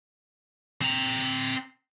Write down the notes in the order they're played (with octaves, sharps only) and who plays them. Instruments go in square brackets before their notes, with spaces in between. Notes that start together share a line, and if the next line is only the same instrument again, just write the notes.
[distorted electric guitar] C4 A#5